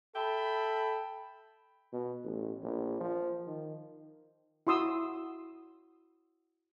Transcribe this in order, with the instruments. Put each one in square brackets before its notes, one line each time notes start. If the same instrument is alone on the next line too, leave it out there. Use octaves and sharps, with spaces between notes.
[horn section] A4 E5 G5 A5 B5
[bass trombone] B2
A1
A#1
F3
D#3
[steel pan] E4 F#4 C6 D#6 E6